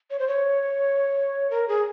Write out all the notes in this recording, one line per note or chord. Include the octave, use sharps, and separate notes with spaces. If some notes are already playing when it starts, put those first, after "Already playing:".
C#5
C5
C#5
A#4
G#4